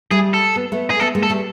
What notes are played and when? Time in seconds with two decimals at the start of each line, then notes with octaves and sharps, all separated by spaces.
0.11 G3 A3 G#4
0.34 A4
0.56 B3
0.72 A3 B3
0.90 G#4
1.00 A3 B3 A4
1.15 G#3 A#3
1.23 A4
1.30 G3 A3